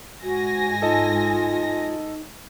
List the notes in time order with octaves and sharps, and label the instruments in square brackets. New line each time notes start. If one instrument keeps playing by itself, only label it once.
[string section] G#2 G#5 A#6 [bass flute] F#4
[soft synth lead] D#4 [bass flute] F4 [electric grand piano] A4 D#5 A5